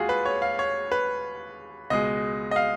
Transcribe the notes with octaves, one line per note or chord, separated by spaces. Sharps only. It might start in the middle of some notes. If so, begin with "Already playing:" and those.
Already playing: D#2 G#3 F4 F#4 G#4
B4
C#5
F5
C#5
B4
C#2 B2 G#3 D#5
D#5
F5